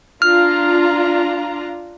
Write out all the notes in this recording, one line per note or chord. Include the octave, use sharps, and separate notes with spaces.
D4 F4 A#5 F6